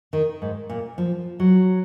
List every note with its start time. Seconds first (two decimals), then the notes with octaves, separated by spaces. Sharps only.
0.13 D#3
0.42 G#2
0.69 A#2
0.98 F3
1.40 F#3